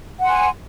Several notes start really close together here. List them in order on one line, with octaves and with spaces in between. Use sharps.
F#5 C6 G#5